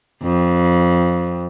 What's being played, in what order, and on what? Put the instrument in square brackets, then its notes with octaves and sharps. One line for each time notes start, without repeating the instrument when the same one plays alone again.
[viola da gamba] F2